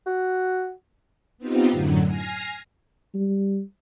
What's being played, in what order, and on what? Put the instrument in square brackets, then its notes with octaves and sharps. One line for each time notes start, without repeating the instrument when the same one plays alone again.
[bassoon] F#4
[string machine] B3 C4 D#4 F4 G4
F#2 A2 D3 F#3
G#5 F6 A#6 C7
[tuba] G3